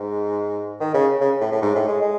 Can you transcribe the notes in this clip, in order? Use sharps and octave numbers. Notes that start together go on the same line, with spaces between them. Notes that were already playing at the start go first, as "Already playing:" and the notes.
Already playing: G#2
D#3
C#3
C#3
A2
A2
G#2
A2
G#3
G#3